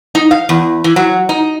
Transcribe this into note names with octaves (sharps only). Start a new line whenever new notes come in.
D#4
F5
E2
E3
F#3
D#4